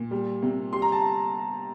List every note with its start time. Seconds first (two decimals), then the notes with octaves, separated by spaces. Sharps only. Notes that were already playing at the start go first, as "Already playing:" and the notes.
Already playing: A#2
0.11 G3
0.42 C3
0.73 G3 C6
0.82 A#5
0.92 A5